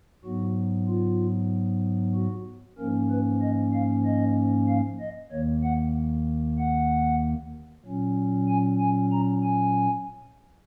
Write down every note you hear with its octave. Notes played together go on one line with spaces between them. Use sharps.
G#2 F#3 B3 F#4
F4
F#4
G#2 F3 A#3 C#4 A#4
B4
D#5
F5
D#5
F5
D#5
D#2 D#3 A#3 C#5
F#5
F#5
A#2 F#3 C#4
G#5
G#5
A#5
G#5